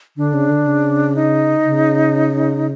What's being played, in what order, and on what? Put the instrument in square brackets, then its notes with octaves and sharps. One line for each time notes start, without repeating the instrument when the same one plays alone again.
[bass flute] D3 [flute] D4
[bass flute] C#3
D3
C#3
[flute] D#4
[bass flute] C#3